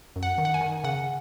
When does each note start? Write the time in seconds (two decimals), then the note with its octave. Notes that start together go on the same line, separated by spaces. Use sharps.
0.16 F#2
0.23 F#5
0.38 D#3
0.45 F#5
0.54 G#5
0.61 D#3
0.84 C#3 F#5